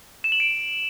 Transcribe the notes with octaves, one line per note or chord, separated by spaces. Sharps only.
E7
F#7
D7